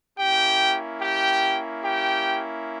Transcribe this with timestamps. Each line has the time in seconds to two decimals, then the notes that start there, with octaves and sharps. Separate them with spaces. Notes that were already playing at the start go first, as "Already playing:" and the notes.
0.18 A#3 C#4 E4 G4 G5
1.01 G4 G5
1.85 G4 G5